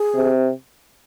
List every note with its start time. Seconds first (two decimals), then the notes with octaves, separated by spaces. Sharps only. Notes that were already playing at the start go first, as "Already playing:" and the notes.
Already playing: G#4
0.14 C3